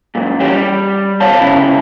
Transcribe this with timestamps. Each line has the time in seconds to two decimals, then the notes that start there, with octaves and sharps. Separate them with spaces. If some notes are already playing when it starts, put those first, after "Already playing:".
0.15 F#2 A#2
0.40 E3 G3 C#4 F#4 G4
0.52 G3
1.20 B2 G4 C5 C#5 F5 A5
1.39 C2 C#3 E4